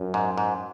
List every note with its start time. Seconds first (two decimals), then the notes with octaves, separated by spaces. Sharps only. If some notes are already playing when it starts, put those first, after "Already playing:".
Already playing: F#2
0.14 G#2
0.38 G#2